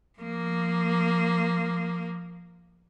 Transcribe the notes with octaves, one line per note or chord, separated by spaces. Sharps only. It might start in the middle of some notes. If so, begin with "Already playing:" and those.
F3 A#3